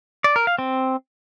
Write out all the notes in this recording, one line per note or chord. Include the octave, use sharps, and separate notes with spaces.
D5
A#4
F5
C4